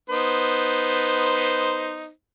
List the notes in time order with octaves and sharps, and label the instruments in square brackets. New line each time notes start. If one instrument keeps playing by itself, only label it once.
[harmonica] B3 D#4 C5